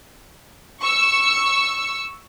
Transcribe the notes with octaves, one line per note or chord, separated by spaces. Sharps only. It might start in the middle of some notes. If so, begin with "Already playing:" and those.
C#6 E6